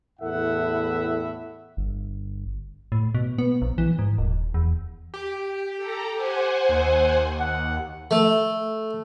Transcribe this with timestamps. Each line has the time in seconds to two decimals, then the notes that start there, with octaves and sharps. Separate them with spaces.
0.20 E2 A2 E4 A4 E5 F#5
1.77 G1
2.92 A2
3.15 B2
3.39 B3
3.62 A#1
3.78 E3
3.99 G#2
4.18 D#1
4.54 E2
5.14 G4
5.77 A4 A#5
6.14 C5 F#5 G#5
6.69 D#2
7.40 F#5
8.11 A3